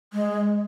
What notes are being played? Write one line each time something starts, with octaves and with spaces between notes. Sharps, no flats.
G#3